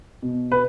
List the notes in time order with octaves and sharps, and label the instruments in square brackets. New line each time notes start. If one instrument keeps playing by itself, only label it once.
[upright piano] B2
B4